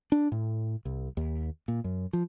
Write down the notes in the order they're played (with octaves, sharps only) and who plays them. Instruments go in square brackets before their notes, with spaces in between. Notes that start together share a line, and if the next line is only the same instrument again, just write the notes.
[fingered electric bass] D4
A2
C2
D#2
A#2
F#2
F3